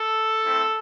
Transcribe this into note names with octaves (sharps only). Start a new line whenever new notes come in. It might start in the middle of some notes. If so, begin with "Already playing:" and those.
Already playing: A4
A3 C4 E4